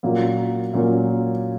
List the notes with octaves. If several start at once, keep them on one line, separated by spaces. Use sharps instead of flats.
A#2 F#3 A#3 C#4
A#2 F#3 A#3 C#4